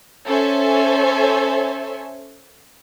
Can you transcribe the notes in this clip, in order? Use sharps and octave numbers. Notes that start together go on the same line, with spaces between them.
C#4 A4 C5 C#5 E5 G#5